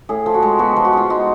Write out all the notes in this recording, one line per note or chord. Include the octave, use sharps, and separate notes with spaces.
A2 G#4
F3
F#4
G#3
B3 F#4
F3 G4
F#4
G#3 F4
D#4 F#4